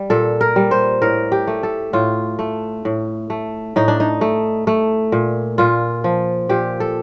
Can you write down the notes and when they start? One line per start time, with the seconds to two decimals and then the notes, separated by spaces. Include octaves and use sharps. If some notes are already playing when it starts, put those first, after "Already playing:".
Already playing: G3
0.10 A#2 A4
0.41 A#4
0.56 G3
0.71 C5
1.02 A2 A#4
1.32 G4
1.47 A3
1.63 A4
1.93 A2 F4
2.39 A3
2.85 A2
3.30 A3
3.76 A2 D#4
3.88 D4
4.00 D#4
4.21 A3
4.67 A3
5.12 A#2
5.58 A#2 F4
6.04 F3
6.49 A#2 G4
6.80 A4